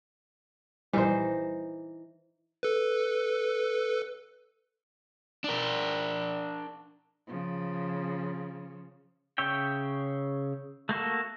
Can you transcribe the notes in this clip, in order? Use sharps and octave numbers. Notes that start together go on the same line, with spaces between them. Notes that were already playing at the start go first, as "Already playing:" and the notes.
A#1 E3 G3 D#4 C5
A4 B4
D4 A#4
C#3 F3
C#3 C#5 E5 G5
A3 A#3 F#4 A4